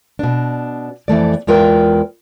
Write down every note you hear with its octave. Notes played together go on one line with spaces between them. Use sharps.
B2 D4
F2 E3 A3 D5
E2 G#3 F4 A#4 B4 G5